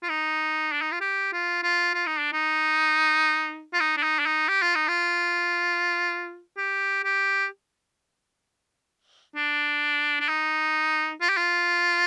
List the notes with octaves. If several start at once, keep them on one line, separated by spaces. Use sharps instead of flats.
F4
D#4
D4
D#4
F4
G4
F4
F4
F4
D#4
D4
D#4
F4
D#4
D4
D#4
D4
D#4
G4
F4
D#4
F4
G4
G4
D4
D4
D#4
F4
G4
F4